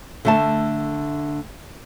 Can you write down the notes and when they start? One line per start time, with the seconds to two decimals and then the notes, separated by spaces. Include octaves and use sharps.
0.25 D3 A3 A5